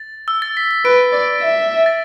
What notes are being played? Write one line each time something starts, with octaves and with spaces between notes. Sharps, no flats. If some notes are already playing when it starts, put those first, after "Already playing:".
Already playing: A6
E6
A6
B6
B6
B4 D7
D5
E5
A6